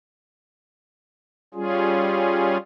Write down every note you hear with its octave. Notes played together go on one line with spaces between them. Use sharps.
G3 C#4 F4 G#4